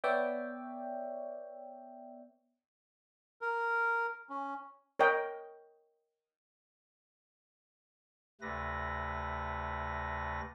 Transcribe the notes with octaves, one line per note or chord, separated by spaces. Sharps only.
B3 C#5 D5 E5 G5
A#4
C#4
A#4 C#5 D#5 G5
D2 C3 A3 B4 A#6